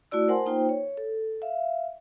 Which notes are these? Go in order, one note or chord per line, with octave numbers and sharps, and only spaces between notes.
A3 E4 F#4 D5 E6
A#4 C5 F#5 G#5 A5 C6
A#3 D#4 F4 C5 G5
C#5
A4
E5 F5